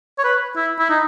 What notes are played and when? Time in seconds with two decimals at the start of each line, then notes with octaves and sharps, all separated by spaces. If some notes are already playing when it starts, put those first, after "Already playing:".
0.19 C#5
0.24 B4
0.56 E4
0.79 E4
0.90 D#4